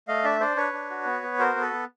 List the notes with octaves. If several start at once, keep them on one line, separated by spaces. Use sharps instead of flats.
A3 D#5 F5
D4 D5 E5
D4 C5 D5
D4 B4 C#5
D4
F#4
B3
B3
F#4 A#4 C5
B3
A4 B4
B3